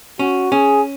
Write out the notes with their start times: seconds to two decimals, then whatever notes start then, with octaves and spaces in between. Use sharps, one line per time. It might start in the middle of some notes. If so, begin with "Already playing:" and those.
0.19 C#4 F#4
0.52 C#4 G#4